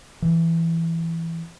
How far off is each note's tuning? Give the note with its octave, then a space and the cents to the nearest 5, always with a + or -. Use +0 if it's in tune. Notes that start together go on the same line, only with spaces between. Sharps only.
E3 +10